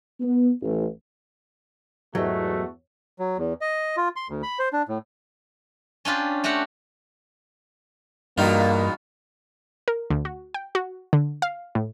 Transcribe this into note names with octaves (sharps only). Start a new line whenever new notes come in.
B3
A1
E2 G#2 F#3 A3 F#4 G4 D#5
F#3
E2
D#5
F4
C6
D2
B5
C5
D4
A2
C#4 D4 F4 G4
A3 F#4 G4 F5 F#5
E2 G2 B2 A#3 D#4 F4 F#4
A#4
D2
F#4
G5
F#4
D3
F5
A2